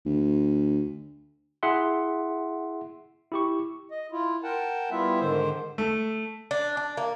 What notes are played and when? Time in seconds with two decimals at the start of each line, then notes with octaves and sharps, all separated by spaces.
0.06 D2
1.63 E4 G#4 E5 F#5 C6
3.32 E4 G4 C#6
3.91 D#5
4.12 E4 F4
4.43 A#4 F#5 G5 A5
4.91 G3 B3 E4 F4 E5
5.20 G#2 D3 D#3 C5
5.78 A3
6.51 D4
6.77 D4
6.97 A#3